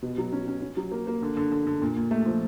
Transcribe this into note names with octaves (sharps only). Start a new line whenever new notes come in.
B2
F#3
C#4
C#4
C#4
F#3
A#3
A#3
D3
D3
D3
D3
A#2
A#2
A3
F3